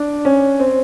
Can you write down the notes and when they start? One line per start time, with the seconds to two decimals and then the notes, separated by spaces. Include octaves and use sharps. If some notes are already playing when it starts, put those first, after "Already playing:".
Already playing: D4
0.25 C#4
0.60 C4